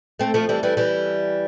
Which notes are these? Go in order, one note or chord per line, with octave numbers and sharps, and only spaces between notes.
A3 C4
F3 A3
E3 G3
E3 G3
E3 G3